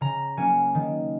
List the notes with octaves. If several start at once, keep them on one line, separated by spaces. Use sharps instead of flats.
C#3 A#5
F#3 A#3 C#4 G#5
D#3